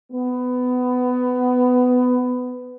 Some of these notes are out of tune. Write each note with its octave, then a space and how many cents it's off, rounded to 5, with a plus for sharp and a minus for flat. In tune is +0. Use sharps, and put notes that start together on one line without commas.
B3 +20